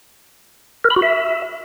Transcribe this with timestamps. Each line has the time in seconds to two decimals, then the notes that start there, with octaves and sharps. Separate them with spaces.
0.84 A#4
0.90 B5
0.96 F#4
1.02 E5